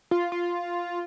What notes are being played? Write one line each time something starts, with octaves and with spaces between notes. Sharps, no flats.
F4
F4